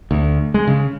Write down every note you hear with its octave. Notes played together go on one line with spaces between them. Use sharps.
D2
G#3
C#3